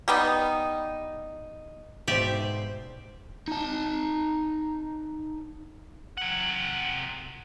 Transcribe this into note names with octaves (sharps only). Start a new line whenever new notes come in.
G3 B3 D#4
G#2 B2 G4 C5 D5 E5
D#4 A5
C3 F#5